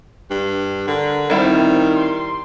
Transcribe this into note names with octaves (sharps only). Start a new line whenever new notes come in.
G2
D3 A#4
D#3 G3 C4 E4
C6